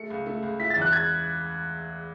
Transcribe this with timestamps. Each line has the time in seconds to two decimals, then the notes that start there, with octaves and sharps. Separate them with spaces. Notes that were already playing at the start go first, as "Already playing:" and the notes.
Already playing: G#3 A3 C#7
0.10 C#2
0.26 A3
0.43 C#2
0.60 E4 B6
0.70 A6
0.76 E2
0.82 F#6
0.93 G#6